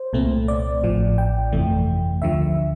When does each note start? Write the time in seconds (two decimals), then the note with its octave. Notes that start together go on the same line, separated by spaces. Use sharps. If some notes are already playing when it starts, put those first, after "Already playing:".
Already playing: C5
0.13 C2 A#2 A3 C4
0.48 D5
0.83 A1 A2 F3
1.18 G5
1.52 G1 F2 C3 E3 A3
2.22 D2 D3 F3 E5